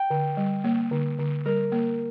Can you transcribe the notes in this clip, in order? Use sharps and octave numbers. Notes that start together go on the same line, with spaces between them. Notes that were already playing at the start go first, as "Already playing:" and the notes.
Already playing: G5
D3
G3
A#3
D3
D3
G3 A#4
A#3